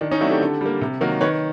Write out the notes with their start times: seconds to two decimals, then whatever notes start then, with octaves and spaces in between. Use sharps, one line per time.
0.01 D#3 D4
0.11 C#4 D#4
0.21 F#3 A3 C4 D4 E4
0.31 G4 A4
0.41 D3
0.61 G3 A#3
0.81 C3
1.01 D#3 F#3 A#3
1.21 D#3 B4 C#5